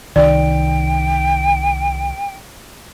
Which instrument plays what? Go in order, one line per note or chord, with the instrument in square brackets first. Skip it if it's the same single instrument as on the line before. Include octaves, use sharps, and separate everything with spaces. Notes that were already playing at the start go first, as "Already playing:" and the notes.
[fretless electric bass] C2 D#3 [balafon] D5 [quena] G5